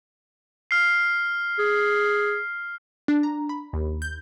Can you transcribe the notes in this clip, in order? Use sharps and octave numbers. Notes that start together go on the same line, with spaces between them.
F6 C7
G#4
D4
A#5
B5
D#2
G6